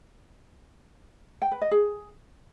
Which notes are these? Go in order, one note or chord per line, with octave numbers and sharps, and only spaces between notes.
G5
B4
D#5
G#4